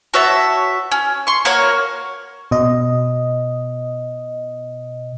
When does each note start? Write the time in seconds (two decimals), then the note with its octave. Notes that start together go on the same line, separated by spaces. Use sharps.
0.14 F#4 C#5 E5 A5
0.91 C#4
1.27 C6 C#6
1.45 A#3 F#4 A#4 C#5
2.51 B2 D#5